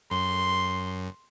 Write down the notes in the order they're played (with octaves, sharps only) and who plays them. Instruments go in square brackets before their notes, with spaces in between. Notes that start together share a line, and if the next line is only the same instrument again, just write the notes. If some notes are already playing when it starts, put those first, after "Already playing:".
[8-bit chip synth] F#2 [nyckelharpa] C6